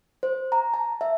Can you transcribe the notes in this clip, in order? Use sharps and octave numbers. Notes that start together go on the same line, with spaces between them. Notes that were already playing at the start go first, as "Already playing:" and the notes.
C5
A#5
A5
E5